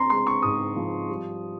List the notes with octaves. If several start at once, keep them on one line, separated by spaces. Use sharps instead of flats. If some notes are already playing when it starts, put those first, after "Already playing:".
Already playing: C4 A#5 C6
G#3 C6
C#6
G#2 D#6
F3
G3